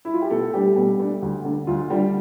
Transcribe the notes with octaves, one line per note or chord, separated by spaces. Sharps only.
E4
F4
G4
B2 A3 A4
G3 A3 D4 G4
B2 G3 G4
A3 D4
D2
D3 A3 D4
D2 F4
D3 G3 A3 D4 G4